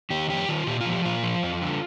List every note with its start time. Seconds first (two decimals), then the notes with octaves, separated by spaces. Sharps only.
0.10 D#3 G4
0.29 F2 G4
0.49 D#3 F4
0.67 A#2 G4
0.81 F4
0.86 F3
0.92 G4
1.05 A#2 F4
1.23 F3
1.43 F2
1.62 D3